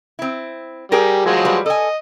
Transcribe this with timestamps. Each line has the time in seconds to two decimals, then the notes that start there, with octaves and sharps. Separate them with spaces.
0.19 C4 E4
0.92 G3 G4 G#4 A#4
1.25 F3 F#3 G#3
1.45 G3 B4
1.66 A4 D#5 G#5